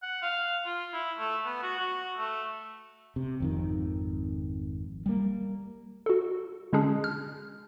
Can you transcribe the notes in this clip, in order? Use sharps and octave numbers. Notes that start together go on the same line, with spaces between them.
F#5
F5
F4
E4
A3
B3
F#4
F#4
A3
C3
G#1 F2 D#3
G3 A#3
F#4 A4
D3 G#3 C#4 D4 G#4
F6